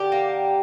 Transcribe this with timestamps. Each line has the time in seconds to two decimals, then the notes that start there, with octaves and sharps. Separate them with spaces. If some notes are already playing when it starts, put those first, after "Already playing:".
Already playing: D3 G4
0.12 A#3